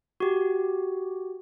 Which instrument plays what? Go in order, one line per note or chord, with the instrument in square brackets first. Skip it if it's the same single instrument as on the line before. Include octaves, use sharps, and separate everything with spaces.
[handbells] F#4 G4